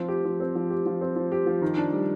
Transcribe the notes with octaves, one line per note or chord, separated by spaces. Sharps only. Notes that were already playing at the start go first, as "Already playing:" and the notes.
Already playing: F3 C4
G4
F3
C4
F3
G4
F3
C4
F3
G4
F3
D#3
D4
G3